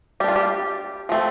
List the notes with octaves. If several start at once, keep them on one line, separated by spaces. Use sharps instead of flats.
G3 D4 F4 G4
G4
F3 A3 C4